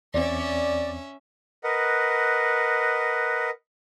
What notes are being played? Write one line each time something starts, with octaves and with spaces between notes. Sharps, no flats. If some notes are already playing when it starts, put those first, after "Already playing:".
E2 C4 C#4 D5 E5
A#4 B4 D#5 F#5